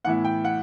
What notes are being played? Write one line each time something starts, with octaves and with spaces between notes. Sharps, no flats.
A2 E3 B3 E4 F#5
G5
F#5